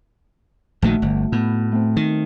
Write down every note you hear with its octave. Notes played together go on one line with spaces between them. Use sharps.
A#1 A#2 D#3 A3 D#4 F#4
G1
A2 B3
A3 C4
D#3